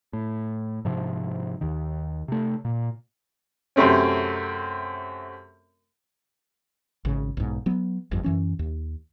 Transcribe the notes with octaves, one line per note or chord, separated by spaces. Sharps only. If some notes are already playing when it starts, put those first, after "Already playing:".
A2
G#2 C3 F3
D#2 D#3
C3 A3
A#2
F#2 C3 A3 C4 C#4
G#1 C#3
B1 G#2
F#3 B3
G1 F2
F#2 E3 C#4
D#2